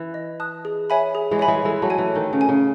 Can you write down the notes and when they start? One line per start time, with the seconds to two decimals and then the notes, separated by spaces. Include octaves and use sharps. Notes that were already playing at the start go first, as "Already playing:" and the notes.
Already playing: E3
0.14 D#5
0.40 A5 D#6 F#6
0.65 G#4
0.90 C#5 E5 G#5 B5
1.15 G#4
1.31 E3 G#3
1.39 C#5 E5 G#5 B5
1.48 E3 G#3
1.65 E3 G#3 A4
1.82 F#3 A3
1.90 C#5 G#5
1.98 E3
2.15 D#3 A4
2.33 C#3
2.41 C#5 G#5
2.49 C#3